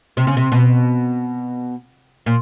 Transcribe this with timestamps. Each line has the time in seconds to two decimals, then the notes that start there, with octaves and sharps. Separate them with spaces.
0.17 C3
0.27 C#3
0.37 C3
0.52 B2
2.26 A#2